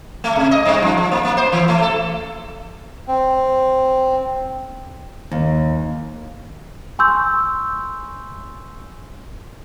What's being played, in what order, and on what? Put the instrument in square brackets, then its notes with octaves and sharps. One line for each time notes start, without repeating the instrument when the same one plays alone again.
[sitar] A3
C3
D#5
G2
F3
F3
A#3
A#3
C5
E3
A3
A4
[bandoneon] C4
[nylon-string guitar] D#2
[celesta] G#5 C6 C#6 E6 G6